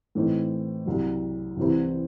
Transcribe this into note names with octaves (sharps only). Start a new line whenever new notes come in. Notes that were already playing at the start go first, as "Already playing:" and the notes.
A2 E3 C4 D#4
C2 C3 F#3
C2 C3 E3 C4 E4